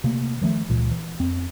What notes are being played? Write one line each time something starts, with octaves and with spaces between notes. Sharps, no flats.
C3 A3 A#3
D#3 F3 G#3 A3
C#2 A#2 E3
E3
F2 C4